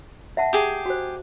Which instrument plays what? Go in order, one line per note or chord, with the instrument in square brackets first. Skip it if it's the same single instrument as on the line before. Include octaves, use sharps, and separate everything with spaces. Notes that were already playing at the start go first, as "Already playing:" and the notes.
[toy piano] E5 F#5 A5
[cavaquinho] G4 G#4
[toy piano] F#4 C5